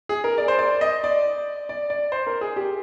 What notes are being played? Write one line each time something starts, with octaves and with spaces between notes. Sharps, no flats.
G#4
A#4
D5
C5
D5
D#5
D5
D5
D5
C5
A#4
G#4
G4